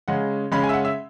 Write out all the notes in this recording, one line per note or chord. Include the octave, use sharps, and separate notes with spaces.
C#3 G#3 C#4 F#5
C#3 G#3 C#4 B5
G#5
E5
F#5
E5